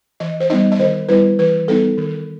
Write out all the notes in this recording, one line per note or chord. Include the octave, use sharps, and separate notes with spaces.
E3 D#5
C5
G3 B3 D#4 D#5
D#5
D#3 C5
G3 B3 E4 B4
E3 B4
G3 B3 D#4 A4
D#3